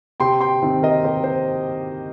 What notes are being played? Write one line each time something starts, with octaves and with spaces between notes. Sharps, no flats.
C3 G5 C6
G5 C6
D#3 C4 D#4
A#4 D#5
C3 G4 C5
C5